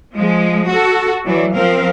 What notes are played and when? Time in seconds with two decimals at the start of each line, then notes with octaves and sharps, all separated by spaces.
0.15 F3 G#3
0.70 F#4 A4
1.25 E3 F#3 D5
1.54 F3 C4 A#4 F5